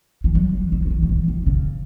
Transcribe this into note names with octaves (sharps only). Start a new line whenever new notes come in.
E3
F#3
E3
F#3
F#3
E3
F#3
E3
D#3
C#3